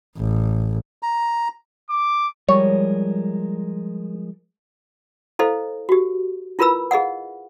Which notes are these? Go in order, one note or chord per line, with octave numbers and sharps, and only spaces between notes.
A1
A#5
D6
F3 G3 G#3 A#4 C#5
E4 A4 C5 D#5 F5
F#4 G4
E4 F4 A#4 B4 B5 E6
G#4 D#5 F5 F#5